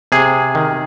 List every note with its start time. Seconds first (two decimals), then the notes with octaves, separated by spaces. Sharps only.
0.12 C3 G#4
0.55 D#3